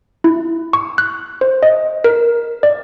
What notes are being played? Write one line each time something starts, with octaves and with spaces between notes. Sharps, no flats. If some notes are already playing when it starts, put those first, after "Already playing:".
E4
C#6
F#6
C5
D#5
A#4
D5